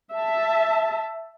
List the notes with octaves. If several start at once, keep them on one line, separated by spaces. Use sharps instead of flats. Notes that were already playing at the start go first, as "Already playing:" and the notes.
E5 A5